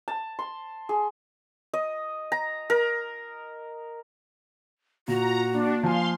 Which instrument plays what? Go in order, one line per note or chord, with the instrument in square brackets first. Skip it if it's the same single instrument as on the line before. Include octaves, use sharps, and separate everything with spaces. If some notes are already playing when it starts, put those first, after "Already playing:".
[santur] A5
C6
G#4
D#5
A#5
A#4
[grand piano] A#2 [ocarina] F4 [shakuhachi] F#4 [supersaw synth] A#5
[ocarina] A#3 [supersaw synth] D4
[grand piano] F3 G#5 [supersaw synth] F5 C6